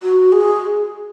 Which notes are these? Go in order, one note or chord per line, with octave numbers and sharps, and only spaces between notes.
F#4
G#4